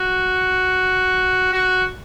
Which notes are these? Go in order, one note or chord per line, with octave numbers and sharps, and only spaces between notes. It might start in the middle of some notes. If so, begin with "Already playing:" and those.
Already playing: F#4
F#4